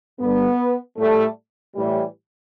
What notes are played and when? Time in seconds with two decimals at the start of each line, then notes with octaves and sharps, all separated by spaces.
0.20 G2 D3 G3 B3
0.98 A2 G3 A3
1.76 A2 E3 G3